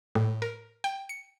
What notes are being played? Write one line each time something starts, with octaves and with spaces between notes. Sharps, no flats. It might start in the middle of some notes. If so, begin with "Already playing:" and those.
A2
A#4
G5
C#7